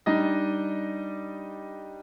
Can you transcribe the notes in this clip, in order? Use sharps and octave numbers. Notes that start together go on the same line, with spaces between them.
G3 D4 D#4 D#5